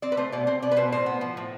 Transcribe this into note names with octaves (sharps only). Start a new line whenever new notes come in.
C4 D5
B4
A3 C5
B2 D5
C4 C5
B2 D5
B4
B2 C5
A2 C5
B3
F3
A2